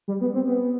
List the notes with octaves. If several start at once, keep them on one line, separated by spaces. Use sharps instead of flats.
G3
B3
C4
B3